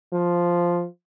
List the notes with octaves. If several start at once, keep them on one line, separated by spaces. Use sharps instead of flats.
F3